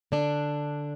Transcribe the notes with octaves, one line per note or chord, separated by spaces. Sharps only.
D3 D4